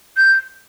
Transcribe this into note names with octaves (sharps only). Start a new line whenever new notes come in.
G6